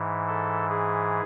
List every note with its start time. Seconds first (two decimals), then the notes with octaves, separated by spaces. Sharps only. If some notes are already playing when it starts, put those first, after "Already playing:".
Already playing: G#2 E3
0.28 A4
0.70 G#4